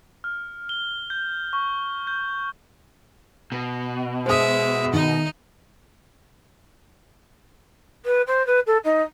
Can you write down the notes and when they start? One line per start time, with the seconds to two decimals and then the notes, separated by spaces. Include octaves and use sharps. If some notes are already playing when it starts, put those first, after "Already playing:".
0.24 F6
0.69 G7
1.10 G6
1.53 C#6
2.07 G6
3.52 B2
4.26 G#3 C5 E5 D#6
4.93 D#3 D#4 D#5
8.05 B4
8.27 C5
8.46 B4
8.66 A4
8.84 D#4